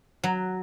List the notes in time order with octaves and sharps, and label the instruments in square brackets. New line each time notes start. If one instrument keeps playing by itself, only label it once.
[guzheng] F#3